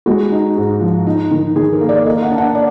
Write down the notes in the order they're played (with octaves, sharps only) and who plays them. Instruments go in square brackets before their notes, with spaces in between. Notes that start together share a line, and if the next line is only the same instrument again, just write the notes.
[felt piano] G#3 F#4
D#4
G#2
F3
D#4
D#3
D#3 G#4
A#4
A#3
D5
A#3 D#5
F#5
D4
F#5
D5